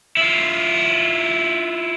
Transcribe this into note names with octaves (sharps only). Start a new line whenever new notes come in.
E4 F4